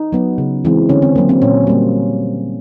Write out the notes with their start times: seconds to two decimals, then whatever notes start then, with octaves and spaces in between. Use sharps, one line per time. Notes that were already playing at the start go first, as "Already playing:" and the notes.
Already playing: D#4
0.12 F#3 B3
0.38 C#3
0.65 E3 G#3 C4
0.89 D3 C#4
1.02 C4
1.16 F#3 A#3
1.29 C4
1.42 A#2 C#4
1.67 G3 A#3